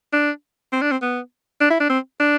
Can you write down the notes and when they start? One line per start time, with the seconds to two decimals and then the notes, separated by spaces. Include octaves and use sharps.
0.13 D4
0.73 C4
0.82 D4
0.92 C4
1.02 B3
1.61 D4
1.71 E4
1.80 D4
1.90 C4
2.20 D4